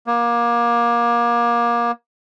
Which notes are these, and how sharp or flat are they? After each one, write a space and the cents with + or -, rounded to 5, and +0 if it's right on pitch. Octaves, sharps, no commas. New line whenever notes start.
A#3 +25